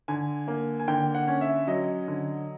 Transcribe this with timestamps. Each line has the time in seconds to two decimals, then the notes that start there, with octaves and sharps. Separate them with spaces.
0.08 D3 G#5
0.48 A#3
0.80 G#5
0.88 D3 G5
1.15 F#5
1.28 C#4
1.41 E5
1.67 F#3 D#5
2.08 D3